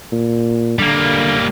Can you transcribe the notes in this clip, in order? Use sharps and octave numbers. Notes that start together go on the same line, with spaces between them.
A#2
D3 G3 A#3